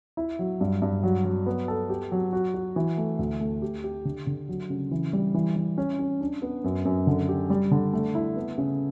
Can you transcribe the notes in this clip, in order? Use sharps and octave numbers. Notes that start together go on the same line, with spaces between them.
E4
F#3
G2
G2
F#3
F#3
B3
A4
G4
F#3
F#4
F#4
E3
A3
D2
A3
G4
G4
D3
D3
F#3
C#3
E3
G3
E3
E3
C#4
C#4
D4
B3
F#2
F#2
D3
G4
G3
D3
A3
E4
B3
C#3